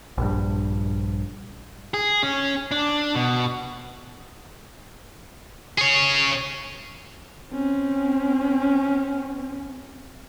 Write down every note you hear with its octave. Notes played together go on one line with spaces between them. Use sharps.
A#1 G2
G#4
C#4
D4
B2
G#4 C#5
C4 C#4